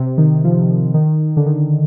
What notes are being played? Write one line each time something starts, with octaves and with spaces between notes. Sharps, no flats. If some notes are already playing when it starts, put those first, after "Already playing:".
Already playing: C3
D#3
F3
D#3
D3
D#3